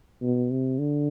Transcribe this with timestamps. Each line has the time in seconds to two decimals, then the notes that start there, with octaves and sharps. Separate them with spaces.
0.22 B2
0.51 C3
0.79 D3